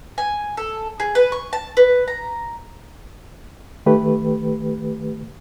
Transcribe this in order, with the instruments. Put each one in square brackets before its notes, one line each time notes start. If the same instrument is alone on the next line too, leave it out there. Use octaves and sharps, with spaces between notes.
[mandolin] G#5
A4
G#4
B4
C#6
A5
B4
A#5
[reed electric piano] D#3 A3 G4 B4